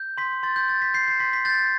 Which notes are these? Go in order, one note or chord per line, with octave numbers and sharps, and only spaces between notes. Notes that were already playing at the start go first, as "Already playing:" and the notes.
Already playing: G6
C6 B6
C6 A6
G6
G6 A6
B6
G6 C7
C7
C6 B6
B6
G6 A6